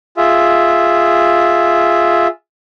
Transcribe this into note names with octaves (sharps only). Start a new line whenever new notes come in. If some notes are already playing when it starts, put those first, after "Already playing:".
F4 G#4 E5